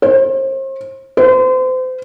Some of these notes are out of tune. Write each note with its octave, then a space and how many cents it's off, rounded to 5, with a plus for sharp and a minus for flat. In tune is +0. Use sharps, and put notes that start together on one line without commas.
C5 +40
C5 -35